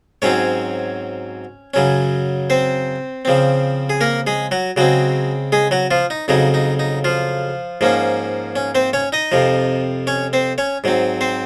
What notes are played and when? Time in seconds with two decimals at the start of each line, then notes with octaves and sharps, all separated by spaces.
0.22 G#2 F#3 C4 C#4 C#5
1.74 F#2 C#3 F#3 C#4
2.50 C4 C5
3.25 C#3 F3 C4
3.90 G#4
4.01 A#3 A#4
4.27 G#3 G#4
4.51 F#3 F#4
4.77 C#3 F#3 G#3 C4 F#4
5.52 G#3 G#4
5.71 F#3 F#4
5.91 F3 F4
6.10 D#4
6.28 F2 C#3 F#3 D#4
6.54 D#4
6.79 D#4
7.04 F3 F4
7.81 G#2 F3 A#3 C#4
8.56 C#4
8.75 C4 C5
8.93 C#4 C#5
9.12 D#4 D#5
9.32 F2 C3 F3
10.07 C#4 C#5
10.33 C4 C5
10.58 C#4 C#5
10.84 G#2 F#3 C4
11.21 C4 C5